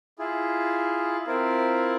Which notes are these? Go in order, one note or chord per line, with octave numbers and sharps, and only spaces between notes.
E4 F4 G#4
C4 E4 F4 A#4